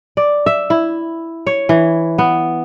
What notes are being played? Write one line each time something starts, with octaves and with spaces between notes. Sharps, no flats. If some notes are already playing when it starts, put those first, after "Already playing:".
D5
E5
E4
C#5
E3
B3